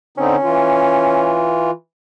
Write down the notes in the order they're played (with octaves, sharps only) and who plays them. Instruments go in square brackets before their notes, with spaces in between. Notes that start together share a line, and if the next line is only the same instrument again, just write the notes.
[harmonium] D3 C4 D#4 [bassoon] C#4
[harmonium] E3 F4